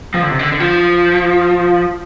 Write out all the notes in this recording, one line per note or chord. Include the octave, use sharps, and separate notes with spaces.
F3
D3
C3
D3
D3
F3